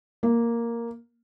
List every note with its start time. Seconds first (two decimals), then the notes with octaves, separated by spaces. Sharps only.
0.23 A#3